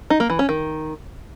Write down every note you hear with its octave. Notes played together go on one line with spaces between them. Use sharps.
D#4
A#3
E3
C#4
D#3